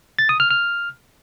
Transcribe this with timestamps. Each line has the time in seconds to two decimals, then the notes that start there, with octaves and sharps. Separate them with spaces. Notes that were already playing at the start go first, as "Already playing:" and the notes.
0.19 A6
0.29 D#6
0.40 F6
0.50 F6